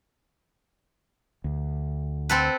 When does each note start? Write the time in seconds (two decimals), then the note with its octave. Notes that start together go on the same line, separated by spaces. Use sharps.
1.44 D2
2.29 C4 A4 B4